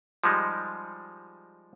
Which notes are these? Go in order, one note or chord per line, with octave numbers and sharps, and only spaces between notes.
F3 G3 G#3 D#4